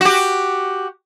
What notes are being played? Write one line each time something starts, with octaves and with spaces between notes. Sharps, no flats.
F#4 G4